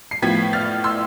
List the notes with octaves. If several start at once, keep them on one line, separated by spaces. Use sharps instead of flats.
C7
A2 F3 B3 G#6 B6
F6 A6
C6 E6